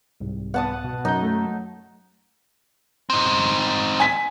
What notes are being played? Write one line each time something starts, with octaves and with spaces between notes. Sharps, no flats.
C2 G#2
B3 F#5 A5 D#6
B2
F#2 F#3 D#4 G6
A3
C4 D#4
G#5 B6